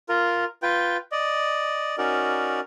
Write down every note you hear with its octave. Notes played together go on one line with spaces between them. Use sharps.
F4 A#4
F4 B4 G5
D5 D#5
C#4 D#4 F#4 A#4 D5